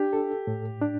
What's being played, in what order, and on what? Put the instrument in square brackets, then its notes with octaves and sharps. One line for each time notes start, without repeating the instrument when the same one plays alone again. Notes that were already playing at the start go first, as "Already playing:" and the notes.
Already playing: [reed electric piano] D4 [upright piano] G4
[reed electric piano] A4
A2
D4